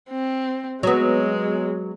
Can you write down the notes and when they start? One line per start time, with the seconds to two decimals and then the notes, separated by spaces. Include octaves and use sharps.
0.11 C4
0.83 F#3 G#3 B3